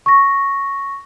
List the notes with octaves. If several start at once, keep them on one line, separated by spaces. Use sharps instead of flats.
C#6 A#6